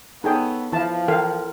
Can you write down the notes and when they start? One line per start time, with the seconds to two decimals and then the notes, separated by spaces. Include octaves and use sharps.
0.24 B3 D#4 G#4 A4 C#5 G5
0.73 E3 F3 E4 F5 A5
1.08 E3 A#4 F5 G5